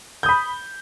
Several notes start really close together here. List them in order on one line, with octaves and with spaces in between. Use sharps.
G6 D#6 B5